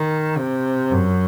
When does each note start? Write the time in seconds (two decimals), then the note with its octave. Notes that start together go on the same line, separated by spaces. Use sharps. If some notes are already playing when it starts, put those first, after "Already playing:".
Already playing: D#3
0.38 C3
0.92 F#2